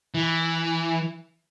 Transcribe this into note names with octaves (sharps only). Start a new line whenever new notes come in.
E3